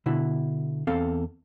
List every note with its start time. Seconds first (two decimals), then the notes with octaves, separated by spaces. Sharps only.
0.06 B2 D3 E4
0.87 E2 C4 A4 F5